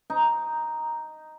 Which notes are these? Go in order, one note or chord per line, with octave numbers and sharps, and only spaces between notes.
D#4